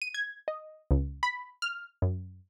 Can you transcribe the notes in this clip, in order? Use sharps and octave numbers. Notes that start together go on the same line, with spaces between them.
D#7
G#6
D#5
C#2
B5
F6
F#2